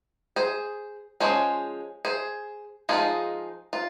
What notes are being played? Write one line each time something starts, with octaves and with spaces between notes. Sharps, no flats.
G#4 C5
F3 G#3 C#4 G#4 C5
G#4 C5
F3 G#3 D#4 F4 G#4
F4